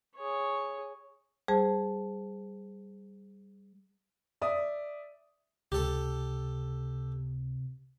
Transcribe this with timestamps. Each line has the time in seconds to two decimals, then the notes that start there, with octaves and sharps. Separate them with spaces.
0.16 G#4 C#5
1.48 G3 G#4 C5 A5
4.42 D5 E5 D#6
5.72 C#2 C3 G4 A4